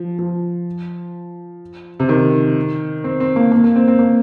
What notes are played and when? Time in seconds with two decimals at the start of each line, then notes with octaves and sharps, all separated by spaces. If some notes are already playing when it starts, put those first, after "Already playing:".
Already playing: F3
0.19 F3
2.00 C3
2.09 D#3
3.04 C4
3.20 C4
3.36 A#3
3.52 A#3
3.64 A#3
3.76 C4
3.88 C4
3.99 A#3